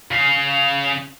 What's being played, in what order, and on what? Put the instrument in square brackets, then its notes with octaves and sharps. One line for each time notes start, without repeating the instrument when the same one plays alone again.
[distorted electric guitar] C#3 F5